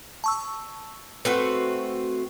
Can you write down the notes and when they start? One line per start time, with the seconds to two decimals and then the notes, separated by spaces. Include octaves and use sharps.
0.24 A5 C#6 E6
1.25 A3 C4 F#4 B4